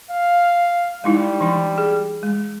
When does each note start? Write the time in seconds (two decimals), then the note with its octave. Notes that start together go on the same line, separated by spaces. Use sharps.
0.11 F5
1.04 G3 G#3 D#4 E4
1.41 E3 D4
1.78 G#4
2.23 G#3